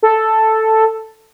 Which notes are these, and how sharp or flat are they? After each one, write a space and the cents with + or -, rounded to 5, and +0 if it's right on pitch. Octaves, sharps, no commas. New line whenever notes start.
A4 +0